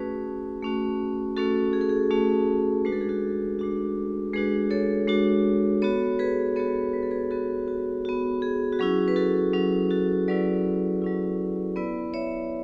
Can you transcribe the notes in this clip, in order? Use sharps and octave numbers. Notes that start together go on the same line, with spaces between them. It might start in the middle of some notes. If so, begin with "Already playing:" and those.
Already playing: A3 C#4 F#4 G#4 B4
A3 C#4 F#4
A3 C#4 F#4 A4
G#4
A4
G#4
A3 C#4 F#4
G#3 D4 F#4 B4
A4
G#4
F#4 A4
G#3 D4 F#4
G#3 D4 F#4 G#4 B4
A4 C#5
G#3 D4 F#4
B3 F#4 A4 C#5
G#4 B4
B3 F#4 A4 C#5
B4
A4
G#4 B4
B3 F#4 A4
F#4
B3 F#4
G#4
F#4
F#3 C#4 E4 G#4
B4
F#4 A4
F#3 C#4 E4
F#4 A4
F#3 C#4 E4 B4 D5
F#3 C#4 E4
B3 E4 B4 D5
C#5 E5